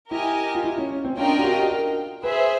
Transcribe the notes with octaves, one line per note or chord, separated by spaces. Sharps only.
E4 G4 A#4 D#5 G#5
F4
E4
C#4
C#4
C4
C#4 D4 F4 A#4 D#5 G5
G4
F#4
A#4
G#4 B4 C5 E5